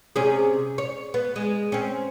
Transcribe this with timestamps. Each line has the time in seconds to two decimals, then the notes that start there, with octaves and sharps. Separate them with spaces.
0.16 C3 C#4 G#4
0.78 C#5
1.14 B3
1.36 G#3
1.72 C4 C#4